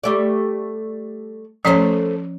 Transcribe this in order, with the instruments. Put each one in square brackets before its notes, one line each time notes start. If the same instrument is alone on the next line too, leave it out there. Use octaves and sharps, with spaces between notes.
[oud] G3 A3 D5
[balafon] F3 C#4 C#5 [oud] A3 C5